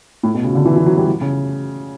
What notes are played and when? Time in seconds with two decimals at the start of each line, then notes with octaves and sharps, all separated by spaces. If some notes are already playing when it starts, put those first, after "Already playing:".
0.23 A2
0.34 B2
0.44 C#3
0.55 D3
0.65 E3
0.76 E3
0.86 F#3
0.97 G3
1.07 F#3
1.21 C#3